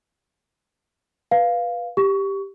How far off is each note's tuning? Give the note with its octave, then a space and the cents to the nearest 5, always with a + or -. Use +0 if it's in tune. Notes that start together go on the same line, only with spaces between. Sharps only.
B4 -10 F5 +0
G4 +0 C#6 +25